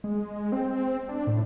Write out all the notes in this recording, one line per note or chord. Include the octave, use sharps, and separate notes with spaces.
G#3
C4
D4
A2